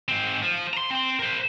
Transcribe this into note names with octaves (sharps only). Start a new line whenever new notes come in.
G#2 C4
F3
A#5 C6
C4 C6
A#4 C5